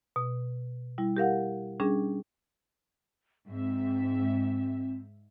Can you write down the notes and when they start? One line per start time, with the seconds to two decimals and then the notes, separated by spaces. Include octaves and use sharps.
0.16 B2
0.98 G3 E4
1.17 G4 A#4 F5 F#5
1.80 G3 C#4 D4 G#4
3.50 G#2 C4 E5